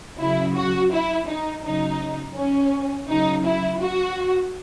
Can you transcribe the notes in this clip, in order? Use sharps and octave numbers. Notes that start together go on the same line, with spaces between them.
C#3 F#3 E4
F#4
E4
D#4
C#3 F#3 D#4
C#4
C#3 F#3 D#4
E4
F#4